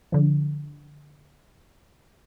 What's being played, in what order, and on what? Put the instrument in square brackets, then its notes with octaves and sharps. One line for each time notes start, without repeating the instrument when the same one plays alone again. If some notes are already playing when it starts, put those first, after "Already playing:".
[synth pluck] D3 F3